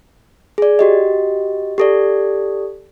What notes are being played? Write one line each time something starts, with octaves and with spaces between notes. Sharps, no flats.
G#4 D5
F#4 G4 D#5
G4 A4 D5